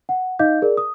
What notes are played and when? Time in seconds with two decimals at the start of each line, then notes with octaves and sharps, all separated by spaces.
0.09 F#5
0.39 D#4 D#5 F5 D6 G6
0.62 G#4 A#4 D5
0.77 D#6